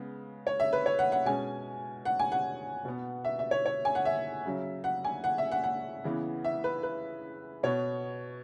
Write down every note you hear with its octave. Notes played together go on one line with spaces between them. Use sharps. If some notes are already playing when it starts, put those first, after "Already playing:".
Already playing: C#3 G#3 B3
C#5
E5
B4
C#5
F#5
F#5
B2 G#3 C#4 G#5
F#5
G#5
F#5
B2 B3
E5
E5
C#5
C#5
G#5
F#5
E5
C#3 F#3 C#4
F#5
G#5
F#5
E5
F#5
F#5
C#3 E3 B3
E5
B4
B4
B2 B3 C#5